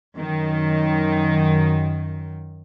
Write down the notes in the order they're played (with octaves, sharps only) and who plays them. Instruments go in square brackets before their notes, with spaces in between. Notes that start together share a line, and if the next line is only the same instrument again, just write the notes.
[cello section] F#2 D#3